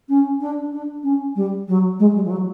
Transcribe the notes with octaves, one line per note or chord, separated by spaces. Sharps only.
C#4
D4
D4
C#4
G3
F#3
G#3
G3
F3
F#3